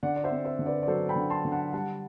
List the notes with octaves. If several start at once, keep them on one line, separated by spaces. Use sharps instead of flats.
D3 D5 F#5
D5
C5 E5
C4
C5 E5
D3
B4 D5
D5
F#3 A4 C5
G5 B5
D3
A5 C6
D3
F#5 A5
G3 F#5 A5